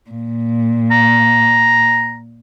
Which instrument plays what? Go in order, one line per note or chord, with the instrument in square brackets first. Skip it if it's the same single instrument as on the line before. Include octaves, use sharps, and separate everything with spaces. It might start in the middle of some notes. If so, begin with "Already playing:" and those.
[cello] A#2
[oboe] A#5